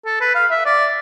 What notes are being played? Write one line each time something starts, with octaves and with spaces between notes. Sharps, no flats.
A4
B4
F5
E5
D5